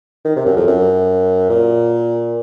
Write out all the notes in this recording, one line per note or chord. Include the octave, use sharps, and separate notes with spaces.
D#3
C3
F#2
F2
F#2
A#2